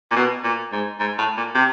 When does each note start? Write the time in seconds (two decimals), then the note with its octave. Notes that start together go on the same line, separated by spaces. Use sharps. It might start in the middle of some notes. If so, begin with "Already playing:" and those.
0.11 A#2
0.16 B2
0.44 A#2
0.72 G#2
1.00 G#2
1.18 A2
1.37 A#2
1.55 C3